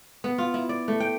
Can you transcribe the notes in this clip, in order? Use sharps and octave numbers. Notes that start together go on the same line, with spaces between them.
B3
F4
E4
D5
A3
G5